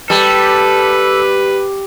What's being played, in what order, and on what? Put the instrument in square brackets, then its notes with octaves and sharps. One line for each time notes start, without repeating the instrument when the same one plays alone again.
[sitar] G3 [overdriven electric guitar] A4 [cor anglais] B4